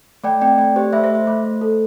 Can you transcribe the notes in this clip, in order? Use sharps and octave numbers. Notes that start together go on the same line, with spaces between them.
A3 D5 G5
C4 D5 G5
A3 D5
G4 C5
A3 C5 E5
C5 E5
A3
C5
A3
A3
A4